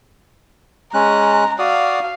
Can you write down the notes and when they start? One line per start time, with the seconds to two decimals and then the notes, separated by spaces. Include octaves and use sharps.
0.94 G#3 C#4 A#5 F#6
1.59 F#4 D5 F5 D#6